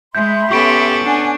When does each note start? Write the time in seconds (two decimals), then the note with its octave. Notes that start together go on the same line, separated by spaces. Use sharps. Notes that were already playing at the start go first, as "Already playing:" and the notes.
0.15 G#3 E5 B5 C6 G6
0.52 B3 C#4 G4 A4 C#6 D7
1.05 D4 F#5 G#5